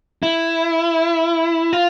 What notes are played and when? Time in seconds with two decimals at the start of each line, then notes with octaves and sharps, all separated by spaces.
0.23 E4
1.73 F4